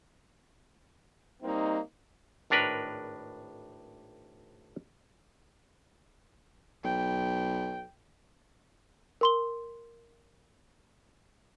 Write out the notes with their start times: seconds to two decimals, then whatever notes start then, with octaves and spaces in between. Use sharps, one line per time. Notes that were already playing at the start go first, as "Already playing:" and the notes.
1.43 G3 A#3 C4 D#4
2.50 G#1 A2 D4 A#4 B4 A#5
6.84 B1 G5
9.21 A#4 C6 G7